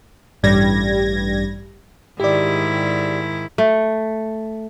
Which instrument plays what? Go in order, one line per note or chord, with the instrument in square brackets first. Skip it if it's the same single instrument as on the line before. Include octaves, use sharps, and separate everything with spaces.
[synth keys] A1 G2 G3 G#6 A#6
[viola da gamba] G#2 D#3 E4 [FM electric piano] G4 D5
[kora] A3